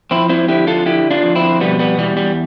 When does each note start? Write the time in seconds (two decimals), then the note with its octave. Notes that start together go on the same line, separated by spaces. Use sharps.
0.11 F2 C4 E4
0.29 C4 E4
0.48 D3 E4 G4
0.67 F4 A4
0.86 D3 E4 G4
1.11 D4 F4
1.23 F2
1.35 C4 E4
1.60 B2 G3 B3
1.79 G3 B3
1.98 E2 G3
2.17 G3